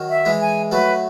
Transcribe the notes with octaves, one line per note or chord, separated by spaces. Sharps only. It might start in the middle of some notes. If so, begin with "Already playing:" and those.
Already playing: D#3 F#3
E5
E3 G#3
G#5
F#3 A3 B4